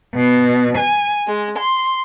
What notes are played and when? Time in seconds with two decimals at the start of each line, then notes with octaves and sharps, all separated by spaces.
0.14 B2
0.78 G#5
1.27 G#3
1.58 C6